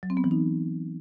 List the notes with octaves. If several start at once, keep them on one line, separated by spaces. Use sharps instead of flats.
F#3
C4
B3
E3
D#4